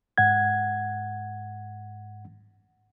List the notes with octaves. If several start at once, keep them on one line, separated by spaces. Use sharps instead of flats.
G#2 F#5 G#6